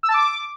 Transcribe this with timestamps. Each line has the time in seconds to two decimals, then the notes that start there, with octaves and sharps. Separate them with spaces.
0.03 E6
0.09 A5
0.14 D6